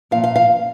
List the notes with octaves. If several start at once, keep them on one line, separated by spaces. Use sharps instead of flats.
A#2 F3 F5
F5
F5